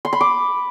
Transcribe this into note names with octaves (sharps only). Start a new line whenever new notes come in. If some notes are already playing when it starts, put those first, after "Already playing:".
C6
B5
D6